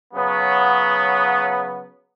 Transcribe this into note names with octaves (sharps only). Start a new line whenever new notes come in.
C#3 F#3 B3